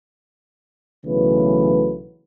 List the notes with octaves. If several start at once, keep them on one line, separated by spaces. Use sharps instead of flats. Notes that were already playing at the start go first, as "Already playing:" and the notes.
B1 C#3 E3 F#3 A3 B4